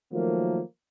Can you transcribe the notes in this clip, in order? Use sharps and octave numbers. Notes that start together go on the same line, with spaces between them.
D#3 F3 F#3 A3 A#3